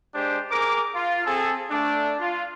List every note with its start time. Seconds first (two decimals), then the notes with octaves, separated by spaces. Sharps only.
0.15 G#3 D4 G4 C5
0.51 G#4 A#4 D6
0.95 F4
1.25 C4 G#4 A4
1.71 A3 D4
2.20 F4